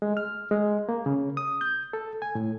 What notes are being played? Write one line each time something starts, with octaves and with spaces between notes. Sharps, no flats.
G#3
F6
G#3
A#3
C#3
D#6
G6
A4
G#5
A2